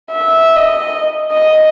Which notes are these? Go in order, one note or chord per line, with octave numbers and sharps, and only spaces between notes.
E5
D#5
D#5